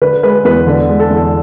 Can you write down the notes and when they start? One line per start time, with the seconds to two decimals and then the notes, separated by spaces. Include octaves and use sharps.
0.02 D3 B4
0.23 G#3 B4
0.45 E2 B4
0.67 D3
0.89 G#3
0.99 A4
1.11 E2